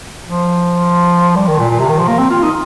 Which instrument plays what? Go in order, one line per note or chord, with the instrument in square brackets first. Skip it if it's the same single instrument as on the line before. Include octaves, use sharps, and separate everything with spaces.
[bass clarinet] F3
G3
D#3
A#2
A#2
C3
D#3
F3
A#3
C4
F4
D#4